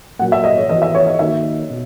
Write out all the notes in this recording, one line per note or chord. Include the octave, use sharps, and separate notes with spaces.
A#2 F#3 A#3 F#5
E5
D#5
C#5
E3 B3 F#4 D#5
E5
C#5
D#5
D#3 A#3 D#4 F#4 E5
B2